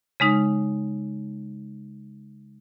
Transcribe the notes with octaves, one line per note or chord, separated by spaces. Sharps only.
C#3 G#3 D#4